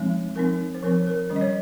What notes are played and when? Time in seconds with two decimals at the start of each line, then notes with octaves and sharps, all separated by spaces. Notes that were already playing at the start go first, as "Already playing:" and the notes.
Already playing: F3 G#3 C4 D#4
0.35 F3 C4 D#4 A#4
0.74 C5
0.83 F3 C4 D#4 A#4
1.07 A#4
1.29 D#3 G3 C#4 C5
1.36 D#5
1.41 C#5